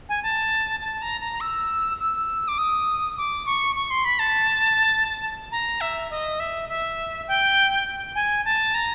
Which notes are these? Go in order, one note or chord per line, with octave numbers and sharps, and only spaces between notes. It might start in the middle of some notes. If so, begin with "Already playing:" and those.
G#5
A5
A5
A#5
A#5
E6
E6
D6
D#6
D6
C#6
C#6
C6
B5
A5
A#5
E5
D#5
E5
E5
G5
G#5
A5
A#5